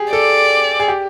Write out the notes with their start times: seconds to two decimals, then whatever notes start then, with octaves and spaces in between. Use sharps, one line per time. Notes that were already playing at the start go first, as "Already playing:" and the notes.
Already playing: G4 G#4
0.12 A4 D5
0.80 G#4
0.88 G4